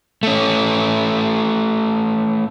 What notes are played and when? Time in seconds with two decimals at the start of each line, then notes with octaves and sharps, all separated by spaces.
0.23 A3 C#4